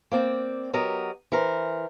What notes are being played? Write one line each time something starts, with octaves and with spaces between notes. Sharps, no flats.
A#3 C4 D5 G5
F#3 B3 G4 A#4 D#5
E3 A#4 C5